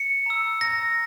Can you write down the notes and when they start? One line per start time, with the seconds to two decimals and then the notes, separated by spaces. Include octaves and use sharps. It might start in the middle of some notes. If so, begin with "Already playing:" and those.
Already playing: C#7
0.26 A#5 E6
0.61 A#5 E6 A#6